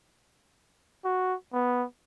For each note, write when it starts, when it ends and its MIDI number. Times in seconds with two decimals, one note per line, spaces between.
1.05 1.35 66
1.53 1.85 59